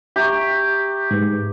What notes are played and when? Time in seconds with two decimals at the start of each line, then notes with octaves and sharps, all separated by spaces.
0.16 G4 E5 A#5 C#6
1.11 G#2 G#4 B4